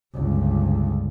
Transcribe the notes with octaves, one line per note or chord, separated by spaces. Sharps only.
G1 C#2